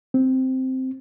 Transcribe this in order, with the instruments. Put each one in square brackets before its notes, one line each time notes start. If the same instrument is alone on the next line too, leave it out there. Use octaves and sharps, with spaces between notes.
[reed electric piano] C4